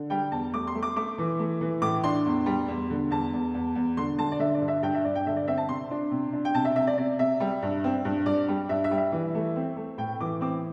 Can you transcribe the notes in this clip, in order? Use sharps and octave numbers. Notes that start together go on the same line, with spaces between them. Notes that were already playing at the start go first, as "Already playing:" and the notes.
Already playing: D3
G3 G5
E2 A5
A3 D6
C6
A3
D6
A3 D6
E3
A3
E3
A2 D6
D4 C6
E2
G3
E2
D3
E2 A5
E2
E2
E2
D3 C6
D3 A5
D5
D3 E5
D5
G2
E5
G2 G5
E5
G2 D5
G5
D3 E5
D5
C4 E5
A5
C3 C6
D4
C3
D4
G5
C3 A5
E5
C3 E5
D5
C3 D5
C3 E5
G3
G2
C4
G2
G2 D5
G3
G2 E5
E5
G3
E5
E3
A3
C4
A3
A2 G5
E3 D6
C4 D6